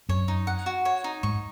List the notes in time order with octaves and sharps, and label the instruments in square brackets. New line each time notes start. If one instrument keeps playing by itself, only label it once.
[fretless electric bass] F#2 [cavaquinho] C#5
[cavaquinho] D#4
F#5
F#4
C#5
D#4
[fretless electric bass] G#2 [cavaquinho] C#6